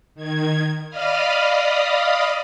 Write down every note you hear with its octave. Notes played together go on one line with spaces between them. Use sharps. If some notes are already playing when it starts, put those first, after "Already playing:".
D#3 G#6
D5 D#5 F5 B5 D#6 F6